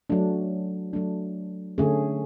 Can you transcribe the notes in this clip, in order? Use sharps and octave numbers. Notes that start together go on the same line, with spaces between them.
F#3 A3 D4
F#3 A3 D4
D3 A3 C#4 G#4